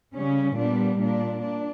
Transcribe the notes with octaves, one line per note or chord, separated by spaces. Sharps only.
C#3 G3 C#4
A#2 G3 B3 D4
A#2 A#3 D4
D4